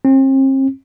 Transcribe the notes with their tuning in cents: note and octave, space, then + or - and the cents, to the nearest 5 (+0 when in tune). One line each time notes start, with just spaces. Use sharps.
C4 +40